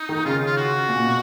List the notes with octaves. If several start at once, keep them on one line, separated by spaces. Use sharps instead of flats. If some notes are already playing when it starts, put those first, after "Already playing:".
Already playing: D#4
D#3
C#3 F4
F4
F#4
A#2
B2